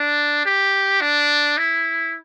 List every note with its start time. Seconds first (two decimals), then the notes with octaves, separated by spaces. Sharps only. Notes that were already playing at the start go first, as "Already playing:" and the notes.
Already playing: D4
0.45 G4
1.01 D4
1.57 E4